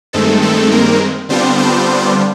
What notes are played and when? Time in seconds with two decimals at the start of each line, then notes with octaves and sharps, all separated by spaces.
0.13 G2 D#3 G#3 A3 C4 A4
0.42 A3 A4
0.71 A#3 A#4
1.29 D3 G3 B3 C4 D4 F4 C5
1.58 C4 C5